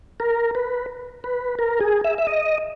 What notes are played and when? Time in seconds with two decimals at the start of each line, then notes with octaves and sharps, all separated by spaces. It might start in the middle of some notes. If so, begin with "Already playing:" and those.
0.20 A#4
0.55 B4
1.24 B4
1.59 A#4
1.81 G#4
2.04 E5
2.18 E5
2.27 D#5